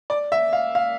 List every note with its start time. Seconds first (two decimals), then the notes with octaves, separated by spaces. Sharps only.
0.10 D5
0.32 E5
0.53 F5
0.75 F5